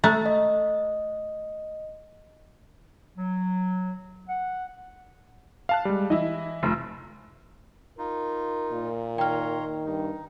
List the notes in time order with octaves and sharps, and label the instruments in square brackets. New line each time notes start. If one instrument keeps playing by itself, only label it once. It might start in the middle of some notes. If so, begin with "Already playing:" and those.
[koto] A3 [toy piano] C5 A#5 D#6
[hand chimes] D#5
[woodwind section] F#3
F#5
[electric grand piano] F5 A5 F#6
G3 G#3
[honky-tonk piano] E3 E4 [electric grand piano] D#5
[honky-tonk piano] F1
[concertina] D#4 F4 [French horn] A#4
[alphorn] A#2
[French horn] D#3 [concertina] C#5 A#5 C6 [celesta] G5 F6
[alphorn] G2 [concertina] D#4